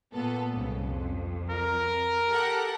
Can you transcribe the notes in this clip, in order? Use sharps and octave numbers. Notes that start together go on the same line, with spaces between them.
A#2 B3 A4
C2 G#2 C#3
F2
A#4
G4 A4 F#5